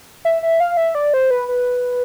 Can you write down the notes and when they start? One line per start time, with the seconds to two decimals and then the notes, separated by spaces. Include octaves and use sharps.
0.25 E5
0.43 E5
0.60 F5
0.77 E5
0.95 D5
1.14 C5
1.31 B4
1.48 B4